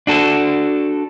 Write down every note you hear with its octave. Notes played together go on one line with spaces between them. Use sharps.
D4 F#4 A4